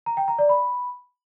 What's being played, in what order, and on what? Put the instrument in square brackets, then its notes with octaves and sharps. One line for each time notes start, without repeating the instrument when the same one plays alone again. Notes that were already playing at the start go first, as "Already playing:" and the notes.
[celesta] A#5
G5
A#5
D5
B5